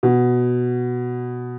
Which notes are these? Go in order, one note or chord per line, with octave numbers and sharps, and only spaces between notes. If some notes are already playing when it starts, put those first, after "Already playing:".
B2